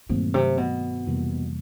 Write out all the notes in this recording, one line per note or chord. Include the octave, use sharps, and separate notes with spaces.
G2 A#2 D#3 F#3 A3 C4
C3
B2
F2 C3 E3 G3 A#3